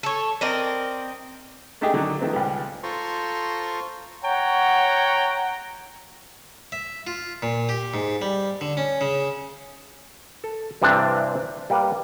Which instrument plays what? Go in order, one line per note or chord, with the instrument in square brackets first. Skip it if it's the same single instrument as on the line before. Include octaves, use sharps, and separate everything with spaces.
[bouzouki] A4 C#5
C4 A#4 D5 D#5
[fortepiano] G#3 A3 D4 D#4 G4 G#4
D3 D#3 F#3
D#3 F3 A3 B3 C4
C#2 G3
[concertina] F4 A4 C5 A#5 C6 C#6
[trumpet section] C#5 F#5 G5 A#5
[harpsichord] E5
F4
A#2
G4
G#2
G3
D3
C#4
C#3
[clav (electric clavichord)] A4
G2 C3 E3 G3 C4 D4
G3 A#3 G4 B4